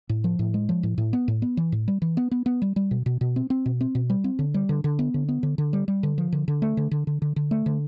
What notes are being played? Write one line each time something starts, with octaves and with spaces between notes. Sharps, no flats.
A2
F3
A2
G#3
F3
A2
A2
B3
A2
B3
E3
A2
G3
E3
B3
B3
B3
G3
G3
B2
B2
B2
C4
C4
B2
C4
B2
G3
C4
D3
G3
D3
D3
B3
D3
B3
D3
D3
G3
G3
D3
F3
D3
D3
A3
D3
D3
D3
D3
D3
A3
D3